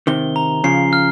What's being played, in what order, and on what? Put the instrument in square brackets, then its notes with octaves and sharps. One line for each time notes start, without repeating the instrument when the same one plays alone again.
[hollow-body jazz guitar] C3 D#3 [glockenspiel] G7
[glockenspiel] A#5
[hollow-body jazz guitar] C#3 F3 [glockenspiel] C7
[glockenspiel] F6